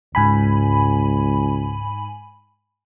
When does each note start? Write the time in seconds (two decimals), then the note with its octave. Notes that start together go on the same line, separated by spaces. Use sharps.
0.15 C#2 G#2 G#5 B5